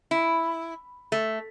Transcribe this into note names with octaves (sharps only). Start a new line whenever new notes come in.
E4
A3